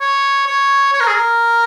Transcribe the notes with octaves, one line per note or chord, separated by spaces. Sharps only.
C#5
C#5
C#5
A#4
G#4
A#4